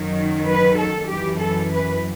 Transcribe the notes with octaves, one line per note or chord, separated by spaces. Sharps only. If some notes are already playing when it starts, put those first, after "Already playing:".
Already playing: F#2 D#3 F#3
B4
A4
F#2 E3 G4
A4
B4